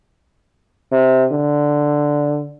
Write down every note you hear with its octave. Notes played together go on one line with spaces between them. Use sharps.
C3
D3